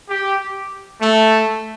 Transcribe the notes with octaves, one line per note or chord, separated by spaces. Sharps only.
G4
A3